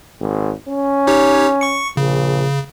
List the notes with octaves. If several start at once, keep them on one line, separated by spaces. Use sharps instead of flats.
G#1
C#4
D#4 G4 C#5
C#6 C#7
A#1 C#3